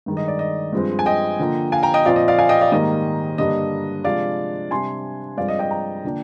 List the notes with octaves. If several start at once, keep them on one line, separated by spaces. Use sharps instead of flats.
G2 D#3 G#3
D#5
D5
D#5
G2 F3 G#3 C4
G#5
D#5 G5
D3 F3 A#3
F5 G#5
G5 A#5
D#5 G5
A#2 F3 C4 D5 F5
D#5
D5 F5
F5 G#5
D#5 G5
D5 F5
G#2 D#3 G3 A#3 D#5
G2 D3 G3 A#3 D4 D#5
C3 F3 G#3 D4 D5 F5
C3 G3 D4 G#5 C6
G2 F3 G#3 C4 D5 F5
D#5
D#5 G5
G5 A#5
D3 F3 A#3 D4